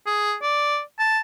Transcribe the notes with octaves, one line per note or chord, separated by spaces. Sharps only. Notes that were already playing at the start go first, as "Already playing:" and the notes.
G#4
D5
A5